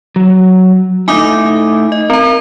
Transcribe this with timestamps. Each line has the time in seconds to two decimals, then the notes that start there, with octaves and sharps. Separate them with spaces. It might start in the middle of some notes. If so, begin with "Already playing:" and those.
0.16 F#3
1.08 A3 D#4 E4 G#5 D6 D#6
1.92 D#5
2.10 C4 A#4 A#5